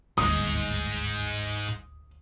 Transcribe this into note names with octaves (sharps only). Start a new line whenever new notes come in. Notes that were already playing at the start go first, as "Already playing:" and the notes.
D1 G1 D#2 G#2 G#3 D#6